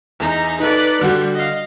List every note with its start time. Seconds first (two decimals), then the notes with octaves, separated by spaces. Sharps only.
0.20 E2 D#4 A#5
0.60 D#4 A4 B4 D5
1.01 D3 G3 F#4
1.34 D#5 F5